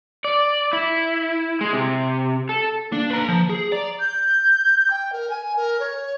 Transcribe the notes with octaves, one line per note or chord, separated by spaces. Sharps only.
D5
E4
G#3
C3
A4
A#3 D4
B4 A#5
F3
G#4
D5 A#5
G6
G5
A#4
G#5
A#4
C#5